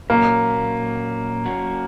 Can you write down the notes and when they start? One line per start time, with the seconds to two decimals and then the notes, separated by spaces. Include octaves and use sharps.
0.10 A#2 F#3 A#3 C#4
1.45 F#3 A#3 C#4 F#4